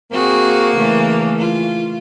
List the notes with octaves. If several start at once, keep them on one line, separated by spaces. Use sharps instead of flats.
A#3 C4 F#4 G#4
C#3 E3 A3
F4